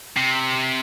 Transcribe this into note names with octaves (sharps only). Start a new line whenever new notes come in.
C3